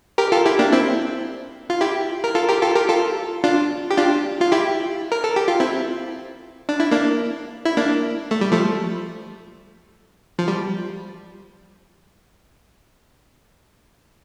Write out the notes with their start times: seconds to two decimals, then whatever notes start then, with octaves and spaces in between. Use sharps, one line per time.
0.18 G4 A#4
0.32 F4 A4
0.46 E4 G4
0.59 A#3 D4
0.72 C4 E4
1.70 F4
1.81 E4 G4
2.24 A#4
2.35 F4 A4
2.48 G4 A#4
2.62 F4 A4
2.75 G4 A#4
2.89 F4 A4
3.44 D4 F4
3.91 G4
3.97 D4 F4
4.41 F4
4.52 E4 G4
5.12 A#4
5.24 A4
5.36 G4
5.48 F4
5.60 C4 E4
6.69 D4
6.80 E4
6.91 A#3 D4
7.65 E4
7.77 A#3 D4
8.31 A3
8.41 G3
8.52 F3 A3
10.39 F3
10.48 G3